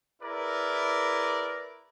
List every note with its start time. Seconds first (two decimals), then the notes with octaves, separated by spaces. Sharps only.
0.22 E4 G#4 A#4 B4 D5